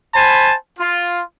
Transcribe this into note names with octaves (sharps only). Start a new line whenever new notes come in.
C5 G#5 A5 B5
F4